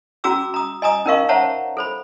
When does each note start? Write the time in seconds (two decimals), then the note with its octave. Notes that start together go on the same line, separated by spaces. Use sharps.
0.24 C#4 F#4 G#4 A#5 D6 E6
0.54 A#5 D#6
0.82 D#5 G#5 A#5 D#6
1.06 C#4 D#4 A#4 D#5 F5 C#6
1.29 C5 C#5 E5 F#5 A5 A#5
1.77 A4 C5 B5